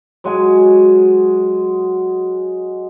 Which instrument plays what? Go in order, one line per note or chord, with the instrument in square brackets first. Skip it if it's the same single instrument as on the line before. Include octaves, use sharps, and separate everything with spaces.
[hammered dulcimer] F#3 G#3 G#5